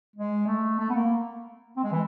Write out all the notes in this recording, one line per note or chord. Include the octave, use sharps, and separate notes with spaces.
G#3
A3
A3
B3
A#3
C4
G#3
E3